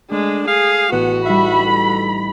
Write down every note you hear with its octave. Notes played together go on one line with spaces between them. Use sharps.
G#3 A3 D4 A4
G#4 F5
A1 B3 F#4 F#6 E7
G3 D4 D#4 E5 B5
A4